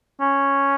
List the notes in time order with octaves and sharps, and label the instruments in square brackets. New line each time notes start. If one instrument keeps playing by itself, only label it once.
[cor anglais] C#4